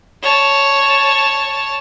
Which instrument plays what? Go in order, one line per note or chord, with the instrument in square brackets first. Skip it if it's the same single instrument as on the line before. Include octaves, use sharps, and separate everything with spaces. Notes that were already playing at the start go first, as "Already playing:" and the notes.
[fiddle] C#5 A5